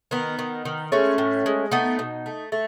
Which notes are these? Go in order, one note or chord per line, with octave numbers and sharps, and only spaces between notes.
D#3 B3 D#4
D#3
D#3
G#3 A3 C#4
A2
G#3
A3 B3 D#4
B2
A3
A3